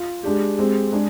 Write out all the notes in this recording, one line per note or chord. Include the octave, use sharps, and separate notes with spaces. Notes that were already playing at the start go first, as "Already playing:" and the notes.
Already playing: F4
G#3 D4 G4
G#3 C4 G4
G#3 D4 G#4